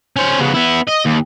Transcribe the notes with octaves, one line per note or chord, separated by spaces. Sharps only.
C#4 C5
C#3 B3
B3 E4
D#5
D#2